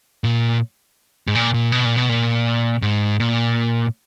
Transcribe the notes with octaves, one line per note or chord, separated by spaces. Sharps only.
A#2
G#2
A#2
A#2
B2
A#2
B2
A#2
G#2
A#2